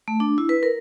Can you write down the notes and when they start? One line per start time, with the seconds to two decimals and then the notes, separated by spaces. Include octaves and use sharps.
0.08 A3
0.20 D4
0.38 E4
0.49 B4
0.63 A#4